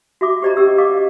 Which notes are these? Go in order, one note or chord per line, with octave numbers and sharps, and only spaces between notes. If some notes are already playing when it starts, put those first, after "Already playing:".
F#4 E5 D6
G4 C5 D5 D#5 A#5
C#4 G4 E6
G4 D#5 F5 D6